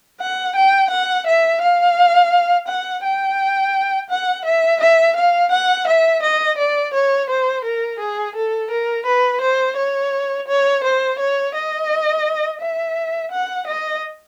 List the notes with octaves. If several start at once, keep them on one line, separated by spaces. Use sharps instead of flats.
F#5
G5
F#5
E5
F5
F#5
G5
F#5
E5
E5
F5
F#5
E5
D#5
D5
C#5
C5
A#4
G#4
A4
A#4
B4
C5
C#5
C#5
C5
C#5
D#5
E5
F#5
D#5